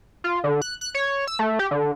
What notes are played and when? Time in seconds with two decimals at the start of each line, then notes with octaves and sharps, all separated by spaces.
0.24 F4
0.44 D3
0.62 F#6
0.81 F#6
0.95 C#5
1.27 E6
1.39 A3
1.59 G4
1.71 D3